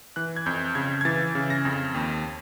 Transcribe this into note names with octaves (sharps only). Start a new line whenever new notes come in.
E3 F#6
G#6
F2 G6
C#3 G#6
G#6
E3 A6
C#3
A#6
F2
D#2